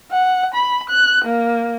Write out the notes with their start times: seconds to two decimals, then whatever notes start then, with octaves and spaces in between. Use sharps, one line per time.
0.11 F#5
0.54 B5
0.89 F#6
1.25 A#3